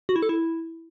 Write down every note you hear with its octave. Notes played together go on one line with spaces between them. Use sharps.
F#4
E4
A4
E4